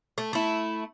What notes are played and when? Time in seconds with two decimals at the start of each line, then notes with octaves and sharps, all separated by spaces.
0.18 A3
0.33 A3 E4